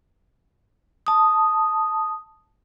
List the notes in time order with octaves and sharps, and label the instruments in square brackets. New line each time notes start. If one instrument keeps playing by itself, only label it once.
[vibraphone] A5 D#6